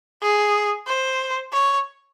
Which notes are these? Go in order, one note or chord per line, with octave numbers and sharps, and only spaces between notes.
G#4
C5
C#5